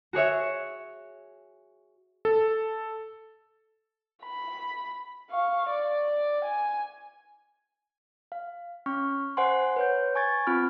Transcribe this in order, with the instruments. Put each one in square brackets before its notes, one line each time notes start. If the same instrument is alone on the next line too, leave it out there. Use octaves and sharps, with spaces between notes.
[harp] F#4 G#4 C#5 E5
[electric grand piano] A4
[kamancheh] B5
F5 C#6
D5
G#5
[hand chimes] F5
C#4 C#6 F6
C5 F#5 G#5 C6
B4 C#5 G6
G#5 C#6 G#6 A6
C4 F4 B5 F6